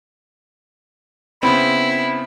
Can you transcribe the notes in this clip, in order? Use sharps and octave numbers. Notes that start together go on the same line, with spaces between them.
C#3 B3 C4 E4 B5